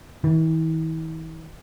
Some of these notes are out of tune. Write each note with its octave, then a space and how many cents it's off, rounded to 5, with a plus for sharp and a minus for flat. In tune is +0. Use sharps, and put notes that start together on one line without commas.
E3 -45